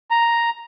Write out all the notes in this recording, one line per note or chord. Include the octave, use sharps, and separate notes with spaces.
A#5